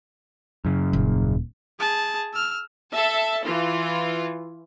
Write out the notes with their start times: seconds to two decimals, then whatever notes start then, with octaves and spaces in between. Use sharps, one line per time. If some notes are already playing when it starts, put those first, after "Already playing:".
0.65 F#2 C#3
0.93 D#1
1.80 G#4 A5
2.33 E6 F6
2.91 A4 E5 A5
3.43 E3 F4